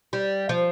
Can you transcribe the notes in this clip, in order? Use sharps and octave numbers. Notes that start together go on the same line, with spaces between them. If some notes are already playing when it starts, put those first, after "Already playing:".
G3
F3